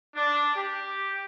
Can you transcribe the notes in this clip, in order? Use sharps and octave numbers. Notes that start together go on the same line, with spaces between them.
D4
G4